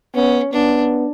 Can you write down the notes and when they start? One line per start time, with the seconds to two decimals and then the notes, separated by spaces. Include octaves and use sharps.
0.15 B3 C#4
0.53 B3 D4